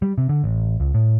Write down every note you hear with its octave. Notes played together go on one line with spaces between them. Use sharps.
G3
C3
D3
A1
C#2
A2